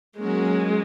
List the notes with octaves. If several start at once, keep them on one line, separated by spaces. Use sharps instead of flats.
F#3 G#3 A#3 C#4 F#4 A#4